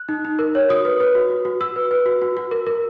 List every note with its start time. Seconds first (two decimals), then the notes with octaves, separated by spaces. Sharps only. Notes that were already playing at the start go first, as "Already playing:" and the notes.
Already playing: F#6
0.09 D#4
0.25 D#4
0.39 A#4
0.55 C#5
0.69 F#4 D#6
0.85 B4
1.00 B4
1.15 F#4
1.30 F#4
1.45 F#4
1.61 F#4 E6
1.76 B4
1.91 B4
2.06 F#4
2.22 F#4
2.37 F#4
2.51 A#4
2.67 A#4